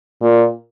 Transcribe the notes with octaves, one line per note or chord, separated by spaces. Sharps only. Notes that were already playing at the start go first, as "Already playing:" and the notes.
A#2